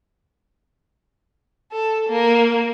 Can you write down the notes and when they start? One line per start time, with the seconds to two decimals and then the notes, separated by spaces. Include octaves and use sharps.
1.72 A4
2.09 A#3